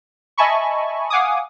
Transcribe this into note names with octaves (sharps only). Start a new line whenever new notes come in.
D#5 E5 G#5 A5 B5 C#6
F5 F#5 G#5 D6 D#6